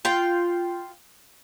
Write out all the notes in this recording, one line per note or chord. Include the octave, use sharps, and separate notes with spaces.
F4 G5